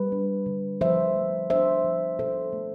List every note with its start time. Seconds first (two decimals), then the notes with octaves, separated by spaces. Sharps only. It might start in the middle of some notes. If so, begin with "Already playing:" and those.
Already playing: G3 B4
0.12 D4
0.46 D3
0.81 F3 C5 E5
1.15 A3
1.50 D4 C5 E5
1.84 F3
2.19 B2 A4 C5
2.53 A3